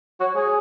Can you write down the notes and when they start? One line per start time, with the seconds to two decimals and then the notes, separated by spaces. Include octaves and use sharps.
0.20 F#4 C#5
0.35 G#4 C#5